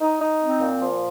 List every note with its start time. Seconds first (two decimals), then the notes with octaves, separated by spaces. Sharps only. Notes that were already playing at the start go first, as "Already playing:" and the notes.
0.01 D#4
0.20 D#4
0.40 C4
0.60 A#2
0.80 F3